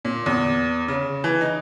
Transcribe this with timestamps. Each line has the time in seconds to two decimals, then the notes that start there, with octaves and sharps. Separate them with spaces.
0.05 A#2
0.26 E2
0.88 C#3
1.24 E3
1.41 D#4